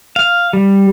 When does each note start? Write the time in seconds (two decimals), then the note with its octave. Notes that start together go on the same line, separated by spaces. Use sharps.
0.16 F5
0.53 G3